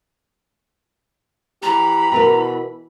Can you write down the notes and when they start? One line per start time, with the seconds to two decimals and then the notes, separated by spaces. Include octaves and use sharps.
1.62 E3 G4 A#5 B5
2.12 B2 E4 A#4 B4